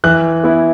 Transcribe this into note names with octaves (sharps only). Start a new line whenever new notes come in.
E3 F#6
B3 E4